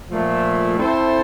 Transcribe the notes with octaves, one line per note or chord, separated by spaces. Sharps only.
A#2 F3 A3
A3 C4 E4 A4 C5